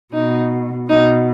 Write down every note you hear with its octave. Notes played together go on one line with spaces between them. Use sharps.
B2 D#4
B2 D#4